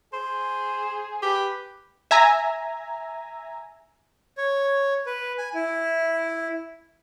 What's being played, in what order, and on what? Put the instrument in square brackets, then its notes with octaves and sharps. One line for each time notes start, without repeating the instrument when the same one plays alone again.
[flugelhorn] G#4 [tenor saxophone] C5
[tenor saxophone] G4 [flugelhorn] B4
[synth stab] E5 G#5 A#5
[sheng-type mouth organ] C#5
B4
G#5
E4